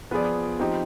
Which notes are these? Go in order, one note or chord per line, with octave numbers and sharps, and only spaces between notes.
F3 B3 F4 G#4 D5
F3 C4 D#4 G4